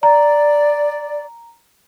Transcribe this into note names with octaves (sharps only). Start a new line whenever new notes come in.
D5 A#5